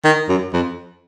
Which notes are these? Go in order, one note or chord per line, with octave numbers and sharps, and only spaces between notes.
D#3
F#2
F2